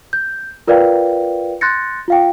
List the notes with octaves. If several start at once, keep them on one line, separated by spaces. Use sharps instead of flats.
G6
F4 A#4 B4 D5 F5 G5
C6 F#6 G6 A6 A#6 C#7
F4 F5 G5